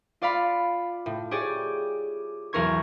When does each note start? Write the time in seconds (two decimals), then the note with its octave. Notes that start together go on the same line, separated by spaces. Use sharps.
0.21 F4 D5 F5 B5
1.06 A2
1.31 G4 G#4 C#5 D5
2.53 B1 E2 A#4 C#6 G#6